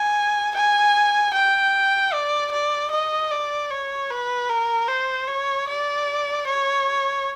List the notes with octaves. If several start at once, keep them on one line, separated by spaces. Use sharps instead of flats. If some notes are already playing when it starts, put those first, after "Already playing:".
Already playing: G#5
G#5
G5
D5
D5
D#5
D5
C#5
B4
A#4
C5
C#5
D5
C#5